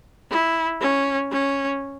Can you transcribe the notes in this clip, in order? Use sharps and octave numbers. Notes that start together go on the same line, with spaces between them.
E4
C#4
C#4